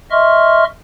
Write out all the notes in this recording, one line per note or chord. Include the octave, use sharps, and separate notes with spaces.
D#5 E5 C6 C#6 F6